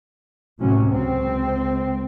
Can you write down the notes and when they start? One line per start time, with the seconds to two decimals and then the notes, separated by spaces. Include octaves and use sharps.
0.59 A2 C3 F#3 C#4
0.89 C#2 C4